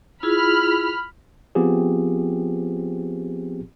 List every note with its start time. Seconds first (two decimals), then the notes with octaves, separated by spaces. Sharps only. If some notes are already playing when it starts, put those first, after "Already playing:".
0.23 E4 F4 G#4 B5 F6
1.55 F3 B3 C4 F4 G4 G#4